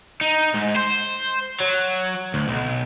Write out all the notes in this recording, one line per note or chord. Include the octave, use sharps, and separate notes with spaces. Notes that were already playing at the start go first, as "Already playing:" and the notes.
D#4
G#2
C5
F#3
D2
B1